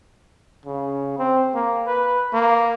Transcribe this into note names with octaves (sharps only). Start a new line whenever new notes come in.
C#3
C4
A#3
B4
A#3